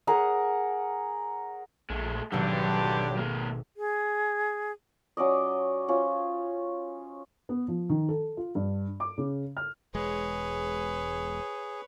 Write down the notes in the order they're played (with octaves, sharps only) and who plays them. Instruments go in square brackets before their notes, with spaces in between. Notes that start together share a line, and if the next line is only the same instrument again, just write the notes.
[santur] G#4 A#4 C#5 F#5
[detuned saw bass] A#1 [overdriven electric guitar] G#3 A3
[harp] G#1 B2 A4 [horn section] G2 G4 [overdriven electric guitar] D3 [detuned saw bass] F#3
[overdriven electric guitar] G#3 A#3
[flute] G#4
[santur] F#3 C#4 D5 D#5
C#4 F4 C5
[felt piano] B3
F3
D#3
A4
F4
G2
D6
C#3
F6
[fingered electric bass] E1 G#3 [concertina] G#4 [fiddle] B4 C#5